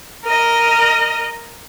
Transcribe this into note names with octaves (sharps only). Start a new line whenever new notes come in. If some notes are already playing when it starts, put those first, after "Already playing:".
A#4 D#5